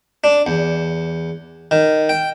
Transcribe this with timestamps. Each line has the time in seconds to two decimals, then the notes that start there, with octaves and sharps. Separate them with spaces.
0.24 D4
0.47 E2
1.71 D#3
2.09 G5